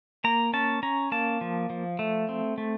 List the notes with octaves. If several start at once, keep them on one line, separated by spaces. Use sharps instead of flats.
A#3 A#5
C#4 A5
C#4 A#5
A#3 A5
F3
F3
A3
C4
A3